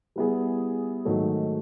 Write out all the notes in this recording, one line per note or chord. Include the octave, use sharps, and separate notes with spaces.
G3 B3 E4 G#4
G#2 D#3 F#3 A3